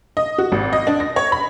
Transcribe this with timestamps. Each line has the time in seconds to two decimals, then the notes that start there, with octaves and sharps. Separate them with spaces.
0.17 D#5
0.38 F#4
0.52 G#1
0.73 D#5
0.87 D4
1.00 A#6
1.16 C#5
1.32 B5